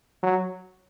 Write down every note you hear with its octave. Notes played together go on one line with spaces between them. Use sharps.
F#3